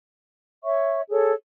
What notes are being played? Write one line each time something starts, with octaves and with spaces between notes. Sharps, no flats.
C#5 E5 C#6
G#4 A4 C#5